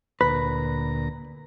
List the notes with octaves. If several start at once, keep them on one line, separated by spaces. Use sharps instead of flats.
D2 A#2 B4 A#5